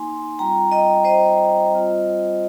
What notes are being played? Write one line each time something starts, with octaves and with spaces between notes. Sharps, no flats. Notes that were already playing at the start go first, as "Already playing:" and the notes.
Already playing: A#3 D#4 G#5 C6
G3 C4 F4 G5 A#5
D#5 G5
C5 D#5
G3 C4 F4